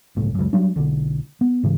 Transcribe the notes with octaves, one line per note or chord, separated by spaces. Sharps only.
G1 C#2 A2
C#2 F#2
F#3 G3 D4
B1 D3
B3
G#2 C#3 E3